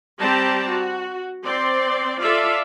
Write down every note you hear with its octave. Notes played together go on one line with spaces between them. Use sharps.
G3 C4 G4 D5 A5 A#5
F#4
C4 D5 C6
F4 A4 D5 E5 F5